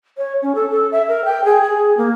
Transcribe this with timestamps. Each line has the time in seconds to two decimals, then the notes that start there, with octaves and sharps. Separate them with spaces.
0.17 C#5
0.42 C#4
0.55 A4
0.70 A4
0.92 E5
1.08 A#4
1.25 G5
1.45 G#4
1.62 G#4
1.97 A#3